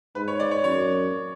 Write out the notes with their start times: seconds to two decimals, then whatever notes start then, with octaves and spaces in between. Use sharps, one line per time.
0.15 G#2 B4
0.28 C#5
0.40 D5
0.51 C#5
0.64 F#2 C#5